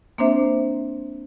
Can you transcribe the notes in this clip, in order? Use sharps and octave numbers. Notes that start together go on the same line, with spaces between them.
A#3 C4 D4 C5 E5